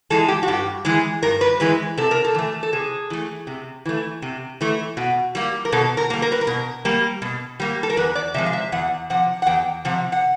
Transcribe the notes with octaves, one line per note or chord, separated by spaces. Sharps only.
E3 G#3 A4
G4
F#4
G2 G4
E3 G#3 G#4
G2 A#4
B4
E3 G#3 B4
C3 A4
A#4
A4
E3 A3
A4
C3 G#4
E3 A3
C3
E3 A3
C3
E3 A3
B2
G3 A#3
A#4
B2 A4
A#4
G3 A#3
A#4
B4
A#4
B2
G3 A#3
B2
G3 A#3
A4
A#4
E2 B4
D5
C3 F3 G#3 E5
F5
E5
E2 F#5
C3 F3 F#5
F#5
E2 G5
C3 F3 F#5
F#5